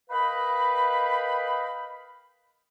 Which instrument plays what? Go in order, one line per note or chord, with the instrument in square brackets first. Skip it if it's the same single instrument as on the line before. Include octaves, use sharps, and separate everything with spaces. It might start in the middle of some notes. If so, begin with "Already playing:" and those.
[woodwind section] A#4 B4 D#5 F5 G5 B5